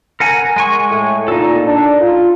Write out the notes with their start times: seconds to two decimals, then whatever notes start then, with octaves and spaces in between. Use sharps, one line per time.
0.20 A#4 F#5 G#5
0.56 G#3 G#5 C#6
0.90 A2
1.28 A#2 D#4 A4
1.66 D4
2.01 F4